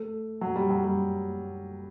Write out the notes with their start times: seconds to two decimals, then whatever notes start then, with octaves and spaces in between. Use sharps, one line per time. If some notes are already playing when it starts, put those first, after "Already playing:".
Already playing: A3
0.41 F#3
0.56 G3
0.70 F#3
0.84 G3